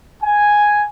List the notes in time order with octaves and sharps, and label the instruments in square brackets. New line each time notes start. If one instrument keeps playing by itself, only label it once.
[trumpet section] G#5